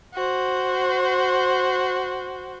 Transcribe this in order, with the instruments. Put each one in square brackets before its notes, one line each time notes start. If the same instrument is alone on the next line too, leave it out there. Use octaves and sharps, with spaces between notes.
[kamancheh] F#4 C5